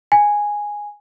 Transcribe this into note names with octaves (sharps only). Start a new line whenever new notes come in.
G#5